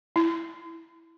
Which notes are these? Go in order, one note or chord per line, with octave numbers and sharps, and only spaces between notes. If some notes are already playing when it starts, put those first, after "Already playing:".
E4